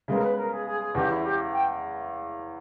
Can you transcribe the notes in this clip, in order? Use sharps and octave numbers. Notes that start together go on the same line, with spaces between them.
C#3 G#3 B3 A#4
B4
A#4
G#4
G#4
G#4
E2 C#3 E3 G4
E4
G4
G5